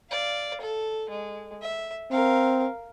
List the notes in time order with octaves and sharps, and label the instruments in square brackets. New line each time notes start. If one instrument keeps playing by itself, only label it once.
[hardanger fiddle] D5 F5
A4
G#3
E5
[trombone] C4 [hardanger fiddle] A#4 F5